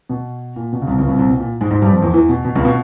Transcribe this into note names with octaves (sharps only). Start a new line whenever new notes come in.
B2
A#2
B2
C#3
C2 C3
C#2 C#3
C2 C3
C2 C3
B2
A#2
G#2 G#3
G#2 G#3
G2 G3
F2 F3
E2 E3
E2 E3
B2
B2
C#2 C#3
B2